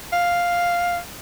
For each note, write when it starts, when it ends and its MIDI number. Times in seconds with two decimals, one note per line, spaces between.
0.12 0.98 77